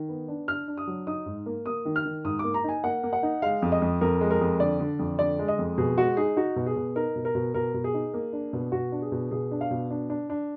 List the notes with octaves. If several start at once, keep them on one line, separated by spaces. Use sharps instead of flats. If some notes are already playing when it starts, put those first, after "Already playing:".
Already playing: D#3
B3
D4
D4 F6
D4
D#6
F#3
D#4 D#6
G#2
A#3
A#3 D#6
D#3
F6
D#3
G#2 D#6
A#3 D6
A#5
D#4 G#5
A#3 F#5
A#3
F#5
D#4
G#3 F5
F2
D#5
F2
F2 A#4
G#3
A#4
F2
D3 D5
D3
F2
D3 D5
G#3
D#5
F2
B2 G#4
G#3 F#4
D#4 G#4
D#4 F#4
B2
G#4
B2
D#4 A#4
B2
A#4
B2
B2 A#4
B2
G#4
D#4
A#3
D4
B2
B2 F#4
D4
G#4
B2
B2 G#4
D4
F5
B2
D4
D4
D4